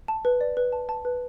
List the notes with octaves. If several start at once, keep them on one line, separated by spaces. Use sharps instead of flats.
A5
B4
D5
B4
A5
A5
B4